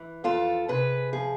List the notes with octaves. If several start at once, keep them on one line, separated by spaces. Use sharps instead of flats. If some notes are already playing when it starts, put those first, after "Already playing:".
Already playing: E3
F2 F4 A4
C3 G#4 B4
F3 G#4